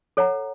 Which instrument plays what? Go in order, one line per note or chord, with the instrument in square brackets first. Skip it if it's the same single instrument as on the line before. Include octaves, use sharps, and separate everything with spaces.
[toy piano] A4 C#5 F#5 A#5